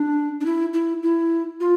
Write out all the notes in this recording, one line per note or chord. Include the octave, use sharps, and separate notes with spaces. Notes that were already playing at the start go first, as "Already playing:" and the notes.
Already playing: D4
D4
E4
E4
E4
F4